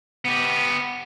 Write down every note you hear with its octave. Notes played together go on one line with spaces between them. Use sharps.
B3 G4